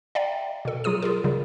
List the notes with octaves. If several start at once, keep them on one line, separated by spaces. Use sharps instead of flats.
D5 E5 F5 G5 A#5
B2 A4
F#3 F4 G#4 D#6 D#7
F4 G#4 A#4
C#3 F#3 G3